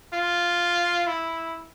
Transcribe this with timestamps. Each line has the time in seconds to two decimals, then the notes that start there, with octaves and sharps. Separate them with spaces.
0.14 F4
1.07 E4